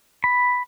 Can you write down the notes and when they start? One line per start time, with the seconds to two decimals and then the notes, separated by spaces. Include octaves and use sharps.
0.24 B5